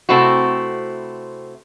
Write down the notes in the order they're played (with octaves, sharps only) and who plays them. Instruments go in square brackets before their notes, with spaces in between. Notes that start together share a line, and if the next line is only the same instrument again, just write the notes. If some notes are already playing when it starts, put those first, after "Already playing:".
[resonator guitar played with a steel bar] C3 A3 C4 E4 F#4